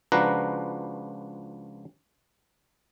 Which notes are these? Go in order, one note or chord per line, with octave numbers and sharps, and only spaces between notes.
C#2 F3 D4 F#4 B4 A#5